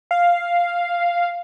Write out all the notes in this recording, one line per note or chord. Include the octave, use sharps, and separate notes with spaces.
F5